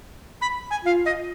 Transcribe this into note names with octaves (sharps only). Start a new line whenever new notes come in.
B5
G#5
F4 F5
D#5